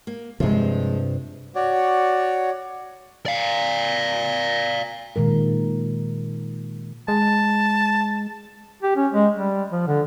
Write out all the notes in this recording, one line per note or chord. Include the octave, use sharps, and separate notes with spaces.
A#3
G2 C3 F3 G#3
F#4 C#5 D5
D5 F5
A#2 D#3 G#3 A#4
G#3 A5
G4
C#4
G#3
G3
F3
D3